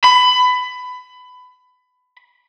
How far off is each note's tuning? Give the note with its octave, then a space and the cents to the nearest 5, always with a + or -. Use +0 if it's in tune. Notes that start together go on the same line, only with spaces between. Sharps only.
B5 +20